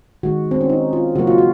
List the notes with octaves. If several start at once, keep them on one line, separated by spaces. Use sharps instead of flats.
D#3 G#3 F#4
C4
C#4
D#4
F4
C#3 F#3 A#3 F#4
F4
F#4